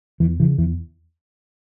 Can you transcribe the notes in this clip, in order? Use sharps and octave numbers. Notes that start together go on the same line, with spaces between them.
E2 E3
C#3 E3
E2 E3